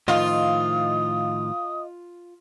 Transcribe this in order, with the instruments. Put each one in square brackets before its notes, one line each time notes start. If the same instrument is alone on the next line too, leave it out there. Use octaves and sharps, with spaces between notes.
[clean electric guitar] A2 D#3 F3 [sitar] F4 [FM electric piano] D#5 F5 [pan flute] D#6